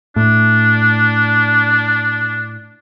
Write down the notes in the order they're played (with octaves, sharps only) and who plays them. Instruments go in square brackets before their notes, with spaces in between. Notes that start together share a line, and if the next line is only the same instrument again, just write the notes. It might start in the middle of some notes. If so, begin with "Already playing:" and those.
[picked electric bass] A2 [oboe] D4